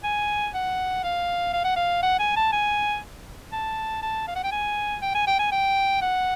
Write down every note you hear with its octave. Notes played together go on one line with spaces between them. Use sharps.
G#5
F#5
F5
F5
F#5
F5
F#5
G#5
A5
G#5
A5
A5
F5
F#5
G5
G#5
G5
G#5
G5
G#5
G5
F#5